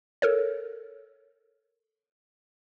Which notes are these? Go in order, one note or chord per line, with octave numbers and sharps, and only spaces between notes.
A4 A#4 C#5